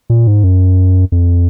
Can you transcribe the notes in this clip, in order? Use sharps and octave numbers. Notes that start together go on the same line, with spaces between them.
A#2
G#2
F#2
F2